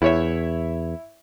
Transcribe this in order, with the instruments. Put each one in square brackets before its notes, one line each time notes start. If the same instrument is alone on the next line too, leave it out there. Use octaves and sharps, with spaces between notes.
[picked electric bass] E2 [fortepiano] E4 C#5 E5